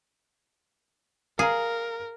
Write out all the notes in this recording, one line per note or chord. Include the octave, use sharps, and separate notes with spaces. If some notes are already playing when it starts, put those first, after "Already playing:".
G#4 A#4 F5 A#5